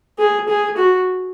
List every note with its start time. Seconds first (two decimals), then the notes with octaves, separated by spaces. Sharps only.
0.19 G#4
0.48 G#4
0.77 F#4